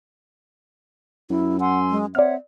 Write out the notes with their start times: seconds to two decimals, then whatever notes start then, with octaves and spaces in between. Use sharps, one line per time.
1.30 F#2 E4
1.60 F#5 G#5 C6 E6
1.90 G#3
2.15 C4 C#5 D5 E5 F#5 F6